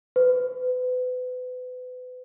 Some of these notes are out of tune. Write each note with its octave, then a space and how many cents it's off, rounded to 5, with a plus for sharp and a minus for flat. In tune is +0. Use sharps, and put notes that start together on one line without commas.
B4 +35